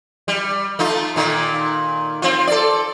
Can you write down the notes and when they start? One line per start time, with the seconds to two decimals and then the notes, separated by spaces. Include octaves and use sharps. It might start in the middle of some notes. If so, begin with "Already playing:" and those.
0.28 G3
0.79 A3 D#4 F4
1.16 A#2 D#3
2.22 C4 F4
2.47 A4 D5